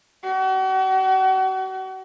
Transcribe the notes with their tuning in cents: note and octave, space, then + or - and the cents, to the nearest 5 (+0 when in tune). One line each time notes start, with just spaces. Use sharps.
F#4 +40